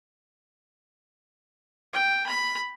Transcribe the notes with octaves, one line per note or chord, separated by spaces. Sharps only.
G5
B5